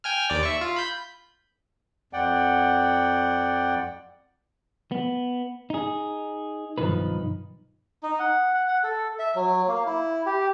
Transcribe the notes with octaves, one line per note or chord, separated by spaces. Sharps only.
G5 G#5 F6
D#2 D5
E5 C#6
F4
B5 G6
F2 D5 F#5 G5
B3
D#4 G#4
B1 G2 D#3 F3 D#4 B4
D#4
F#5
F#5
F#5
A4
E5
F#3
A#3
E4
G4